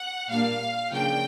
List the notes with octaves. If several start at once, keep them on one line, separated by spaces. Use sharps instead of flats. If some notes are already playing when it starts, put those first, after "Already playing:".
Already playing: F#5
A#2 G3 A#3 D4 F5
C#3 F3 A#3 D4 G5